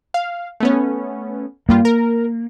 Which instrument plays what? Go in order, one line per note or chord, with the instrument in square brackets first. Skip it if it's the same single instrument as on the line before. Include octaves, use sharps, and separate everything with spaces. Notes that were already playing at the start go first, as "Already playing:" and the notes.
[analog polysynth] F5
A3 B3 C#4
[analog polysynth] G2 G3 F4 [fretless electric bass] A#3
[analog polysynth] A#4